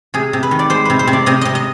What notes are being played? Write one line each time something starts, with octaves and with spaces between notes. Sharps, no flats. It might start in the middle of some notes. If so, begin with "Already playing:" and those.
C3 G#4
C3
B4
D#3
D5
G#3 C5
C3 B4
C5
C3
D5
C3 D#5
C3 D#5
D#5